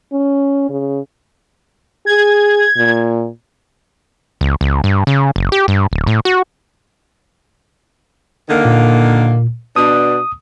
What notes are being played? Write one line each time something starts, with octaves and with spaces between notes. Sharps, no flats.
C#4
C#3
G#4 G#6
A#2
C#2
C#2
G2
C#3
F#1
G4
G2
D1
A2
F#4
D3 D#3 A#3
A#2
B2 D4 D#6